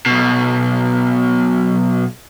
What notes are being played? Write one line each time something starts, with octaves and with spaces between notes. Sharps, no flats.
B1 B2